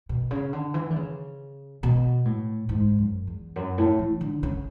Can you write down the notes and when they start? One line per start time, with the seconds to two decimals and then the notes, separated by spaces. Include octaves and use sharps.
0.09 B2
0.31 C#3
0.53 D3
0.74 E3
0.90 D3
0.96 C#3
1.83 B2
2.25 A2
2.69 G#2
2.98 F#2
3.27 E2
3.56 F#2
3.78 A2
3.99 E3
4.21 D3
4.43 C#3